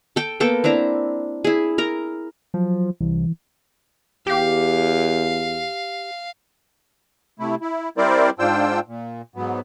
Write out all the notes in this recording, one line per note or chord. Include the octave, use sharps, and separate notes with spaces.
A4 G5
A#3 B3 A4 G5
C4 D4 E4 A#5
E4 G#4
A#4 A#5
F3 F#3
C2 E3
E2 G4 F5
C3 A3 E4
E4
G3 C4 E4 A#4 C5 D5
G#2 D4 F4 C5 G5 E6
A#2
G#2 F#3 B3